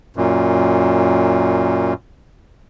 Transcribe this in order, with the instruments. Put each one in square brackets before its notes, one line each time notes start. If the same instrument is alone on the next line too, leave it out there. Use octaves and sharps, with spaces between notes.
[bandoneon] F#2 A#2